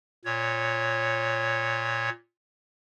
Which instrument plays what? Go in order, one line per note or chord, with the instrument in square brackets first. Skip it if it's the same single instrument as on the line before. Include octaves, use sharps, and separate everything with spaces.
[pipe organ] A#2 C#5